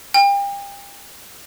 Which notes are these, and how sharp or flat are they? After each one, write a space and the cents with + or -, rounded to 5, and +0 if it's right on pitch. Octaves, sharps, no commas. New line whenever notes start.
G5 +35